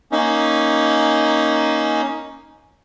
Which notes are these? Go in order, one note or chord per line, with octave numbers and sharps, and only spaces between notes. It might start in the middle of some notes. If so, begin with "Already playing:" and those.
A#3 C#4 D#4